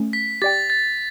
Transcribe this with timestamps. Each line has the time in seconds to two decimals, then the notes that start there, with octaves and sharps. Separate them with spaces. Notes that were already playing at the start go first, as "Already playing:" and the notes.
Already playing: A3 C#4
0.13 B6
0.42 G4 D5 G5 A6
0.70 A6